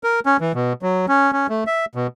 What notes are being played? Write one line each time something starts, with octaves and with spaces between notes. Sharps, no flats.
A#4
C#4
E3
B2
F#3
C#4
C#4
A3
E5
B2